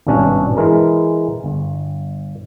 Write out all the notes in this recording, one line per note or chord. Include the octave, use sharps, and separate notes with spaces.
G#1 G2 B2 C#4 D4
E3 G#3 A#4
G1